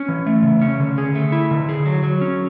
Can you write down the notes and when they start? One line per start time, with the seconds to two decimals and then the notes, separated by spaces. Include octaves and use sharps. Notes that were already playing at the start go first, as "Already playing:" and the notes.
Already playing: C#4
0.08 E3
0.27 A3
0.43 C#3
0.61 C#4
0.80 D3
0.98 G#4
1.15 A3
1.32 E4
1.51 D3
1.69 G#4
1.86 F#3
2.04 F#3
2.21 C#4